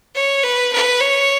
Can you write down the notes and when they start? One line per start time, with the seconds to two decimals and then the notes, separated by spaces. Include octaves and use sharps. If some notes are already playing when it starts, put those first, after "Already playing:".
0.15 C#5
0.43 B4
0.72 B4
1.00 C#5